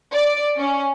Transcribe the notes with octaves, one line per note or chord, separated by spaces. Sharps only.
D5
C#4